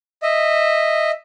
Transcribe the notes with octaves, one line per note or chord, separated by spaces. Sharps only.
D#5 E5